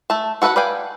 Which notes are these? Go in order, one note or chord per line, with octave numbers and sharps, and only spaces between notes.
A3 A5
F#4 A4 B4 D5 F#5
B4 D5 F5 G5 G#5